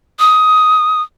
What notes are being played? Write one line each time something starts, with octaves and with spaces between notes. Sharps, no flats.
D#6